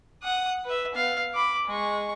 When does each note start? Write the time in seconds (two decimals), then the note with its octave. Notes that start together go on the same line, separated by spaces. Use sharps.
0.23 F#5 D#6
0.65 B4 E5
0.95 B3 F5
1.34 B5 D6
1.67 G#3 C#6